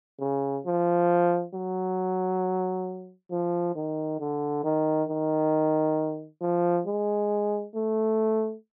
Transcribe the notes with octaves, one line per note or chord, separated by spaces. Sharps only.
C#3
F3
F#3
F3
D#3
D3
D#3
D#3
F3
G#3
A3